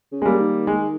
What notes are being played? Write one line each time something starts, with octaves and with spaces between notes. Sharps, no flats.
C#3
G#3
G3 A#3
D#3
G#3